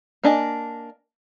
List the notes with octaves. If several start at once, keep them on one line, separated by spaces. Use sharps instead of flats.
A#3 D4 D#5 G#5